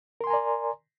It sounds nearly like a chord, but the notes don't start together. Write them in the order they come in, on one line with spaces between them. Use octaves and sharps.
A#4 C6 G#5 A#5 D5